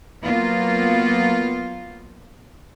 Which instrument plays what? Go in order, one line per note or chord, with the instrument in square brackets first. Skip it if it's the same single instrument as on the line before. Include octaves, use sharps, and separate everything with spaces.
[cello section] F#3 A#3 B3 F4